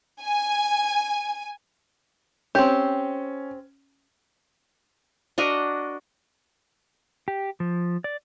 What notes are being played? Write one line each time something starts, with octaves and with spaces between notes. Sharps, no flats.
G#5
C4 C#4 G4
D4 F#4 A#4 D#5
G4
F3
D5